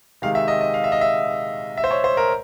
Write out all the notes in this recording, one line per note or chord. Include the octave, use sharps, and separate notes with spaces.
C3 D#3 G#3 F5
E5
D#5
D#5
F5
E5
D#5
E5
E5
C5
C#5
C5
A#4